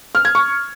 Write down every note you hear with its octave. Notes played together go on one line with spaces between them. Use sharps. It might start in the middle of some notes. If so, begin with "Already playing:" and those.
F6
G#6
C#6